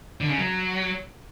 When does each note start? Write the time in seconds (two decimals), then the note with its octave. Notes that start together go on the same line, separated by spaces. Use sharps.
0.21 D3
0.29 C#3
0.38 F#3